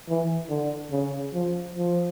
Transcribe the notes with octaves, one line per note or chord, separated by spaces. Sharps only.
E3
D3
C#3
F3
F3